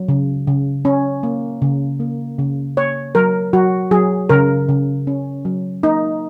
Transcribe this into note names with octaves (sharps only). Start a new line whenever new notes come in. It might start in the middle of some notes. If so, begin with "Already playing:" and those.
Already playing: F#3
C#3
C#3
C#4
A#3
C#3
A#3
C#3
A#3 C#5
F#3 A#4
F#3 F#4
F#3 G#4
C#3 A#4
C#3
C#4
F#3
A#3 D#4